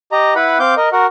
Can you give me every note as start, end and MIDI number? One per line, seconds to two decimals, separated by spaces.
0.12 0.34 67
0.12 0.34 75
0.12 0.34 82
0.35 0.58 64
0.35 0.58 71
0.35 0.58 78
0.35 0.58 83
0.60 0.75 60
0.60 0.75 77
0.60 0.75 86
0.60 0.75 91
0.77 0.89 70
0.77 0.89 75
0.92 1.06 66
0.92 1.06 70
0.92 1.06 78